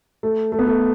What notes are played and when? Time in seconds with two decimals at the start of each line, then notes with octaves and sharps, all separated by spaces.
0.23 A3
0.52 A3
0.59 B3
0.67 A3